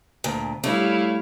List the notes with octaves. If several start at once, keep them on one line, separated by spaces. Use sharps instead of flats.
D2 A#2
G3 A3 E4 C#5 F5